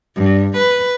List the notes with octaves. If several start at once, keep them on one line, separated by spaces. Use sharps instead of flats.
G2
B4